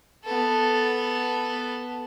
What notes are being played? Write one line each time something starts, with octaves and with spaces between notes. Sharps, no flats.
B3 A4